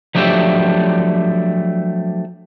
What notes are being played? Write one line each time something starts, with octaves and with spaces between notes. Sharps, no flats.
F3 F#3 A3 D4 G4 E5